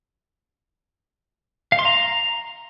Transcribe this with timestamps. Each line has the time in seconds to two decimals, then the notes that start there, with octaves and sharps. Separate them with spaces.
1.72 F5
1.79 C6
1.85 A#5